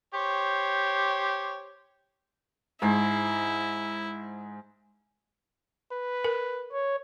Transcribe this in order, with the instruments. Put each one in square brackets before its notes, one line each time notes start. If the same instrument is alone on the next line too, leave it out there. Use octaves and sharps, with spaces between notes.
[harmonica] G4 C5 C#5
[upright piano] G#2 [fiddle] E4 [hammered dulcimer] G#4 C5
[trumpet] B4
[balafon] A#4
[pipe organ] C#5